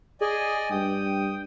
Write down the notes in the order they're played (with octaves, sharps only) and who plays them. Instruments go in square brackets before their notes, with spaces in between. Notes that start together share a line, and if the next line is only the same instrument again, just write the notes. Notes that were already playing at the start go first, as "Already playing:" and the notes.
[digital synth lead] G#4 [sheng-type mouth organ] D5 D#5 G#5
[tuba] G2 [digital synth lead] G5 [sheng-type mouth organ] D#6